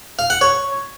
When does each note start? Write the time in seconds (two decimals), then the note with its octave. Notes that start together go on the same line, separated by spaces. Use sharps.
0.19 F5
0.30 F#5
0.41 C#5